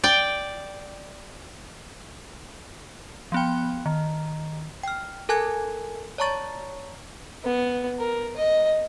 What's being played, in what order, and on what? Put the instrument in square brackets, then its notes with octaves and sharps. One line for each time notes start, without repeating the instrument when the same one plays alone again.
[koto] D5 G5
[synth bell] F3 B3 G5
D#3
[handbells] G5 F6
A4 A#4 G#5 A5 F#6 G#6
C#5 D5 A5 A#5 C#6 A6
[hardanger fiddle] B3
A#4
D#5